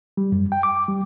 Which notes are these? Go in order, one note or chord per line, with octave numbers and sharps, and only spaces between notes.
G3
F#2
G5
D6
G3